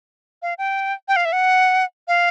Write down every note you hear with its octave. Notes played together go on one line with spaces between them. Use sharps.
F5
G5
G5
F5
E5
F#5
F5